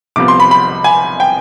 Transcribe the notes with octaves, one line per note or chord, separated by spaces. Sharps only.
C2 C3 F3 B3 D6
C6
B5
B5
G#5
G5